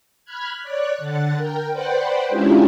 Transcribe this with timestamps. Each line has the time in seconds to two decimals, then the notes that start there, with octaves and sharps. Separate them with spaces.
0.25 B5 F6 F#6 G#6
0.62 C#5 D5 F#6
0.98 D3 F#5 A6
1.37 A#4 G5
1.71 B4 C5 D5 F#5 G5
2.29 G#3 C#4 D4 E4 F4 G4